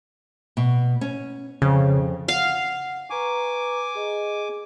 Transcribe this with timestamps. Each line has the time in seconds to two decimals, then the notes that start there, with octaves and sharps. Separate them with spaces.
0.57 B2
1.01 C#4
1.62 F2 C#3
2.28 F5 F#5
3.10 B4 G#5 A#5 C#6 D6
3.95 G#4 D#5